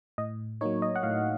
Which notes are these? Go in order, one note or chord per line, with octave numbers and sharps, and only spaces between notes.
A2 D#5
F#3 A#3 D#4 C#5
D#5
F#5
A2 F5